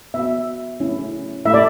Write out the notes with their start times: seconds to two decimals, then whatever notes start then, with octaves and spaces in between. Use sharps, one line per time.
0.14 B3 F#4 E5
0.80 A3 C#4 E4
1.45 A3 E4 E5
1.54 D5